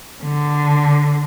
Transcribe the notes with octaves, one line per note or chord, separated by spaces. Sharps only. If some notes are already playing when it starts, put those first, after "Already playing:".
D3